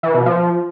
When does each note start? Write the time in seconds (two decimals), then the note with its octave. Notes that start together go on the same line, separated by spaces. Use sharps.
0.03 E3
0.14 B2
0.26 F3